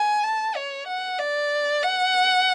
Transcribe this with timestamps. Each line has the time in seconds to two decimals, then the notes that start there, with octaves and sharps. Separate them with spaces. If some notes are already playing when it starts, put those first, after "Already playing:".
Already playing: G#5
0.23 A5
0.56 C#5
0.88 F#5
1.19 D5
1.83 F#5